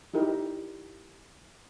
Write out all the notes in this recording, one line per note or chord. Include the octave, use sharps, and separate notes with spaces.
D#4 E4 G4 A#4